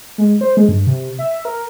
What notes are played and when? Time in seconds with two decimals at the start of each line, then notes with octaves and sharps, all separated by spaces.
0.18 G#3
0.41 C5
0.57 G#3
0.69 G2
0.87 C3
1.19 E5
1.45 A#4